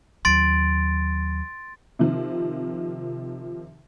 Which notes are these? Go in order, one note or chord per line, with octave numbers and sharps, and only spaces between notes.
D#2 F#3 C6 A6 D7
C3 D#3 F3